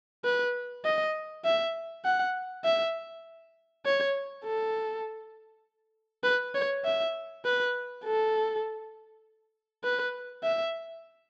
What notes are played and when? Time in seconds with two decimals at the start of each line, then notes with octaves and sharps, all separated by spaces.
0.24 B4
0.85 D#5
1.45 E5
2.05 F#5
2.64 E5
3.85 C#5
4.44 A4
6.24 B4
6.55 C#5
6.85 E5
7.45 B4
8.04 A4
9.84 B4
10.44 E5